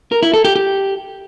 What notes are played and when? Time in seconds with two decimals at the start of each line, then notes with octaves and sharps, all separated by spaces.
0.12 A#4
0.23 E4
0.34 A4
0.45 G4
0.56 G4